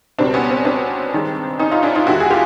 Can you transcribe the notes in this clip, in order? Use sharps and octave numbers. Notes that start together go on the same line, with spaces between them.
C#2 B2 G3 C4 D4
B3 C#4
C4
C4 D4
G2 D#3 G#3
C#4 D#4
D#4 F4
D4 E4
D#4 F4
D#2 D3 G3 E4 F#4
G#4
F4 G4